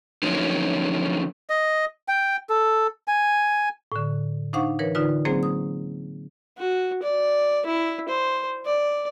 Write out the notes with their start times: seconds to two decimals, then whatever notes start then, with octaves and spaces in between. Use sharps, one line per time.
0.23 D3 F3 F#3 A#3 C#4 D#4
1.50 D#5
2.08 G5
2.49 A4
3.08 G#5
3.92 A2 D3
4.53 D4 D#4 C5 F5 F#5 C#6
4.79 E3 A#4 B4 C#5
4.95 D3 D#4 F4 B4
5.25 F#3 A#3 C4 C#4 G#4 C5
5.43 D#6
6.58 F#4
7.03 D5
7.66 E4
8.09 C5
8.65 D5